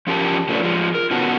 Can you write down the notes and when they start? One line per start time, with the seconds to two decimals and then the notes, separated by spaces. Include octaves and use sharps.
0.07 F3 C#4 F4 G4 A#4 A5
0.49 C#3 F3 A3 C#4 D4 B4
0.63 F3 G#3
0.95 A#4
1.11 B2 D#3 B3 C#4 F#4 A5